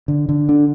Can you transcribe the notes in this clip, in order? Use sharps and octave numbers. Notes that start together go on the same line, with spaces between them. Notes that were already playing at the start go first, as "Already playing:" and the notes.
D3
D3
D4